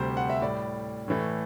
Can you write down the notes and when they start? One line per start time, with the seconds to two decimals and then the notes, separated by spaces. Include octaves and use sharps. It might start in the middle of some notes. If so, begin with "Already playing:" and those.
Already playing: D2 C3 G3 C5
0.17 F#5
0.30 E5
0.41 A2 G3 D5
1.08 A2 E3 A3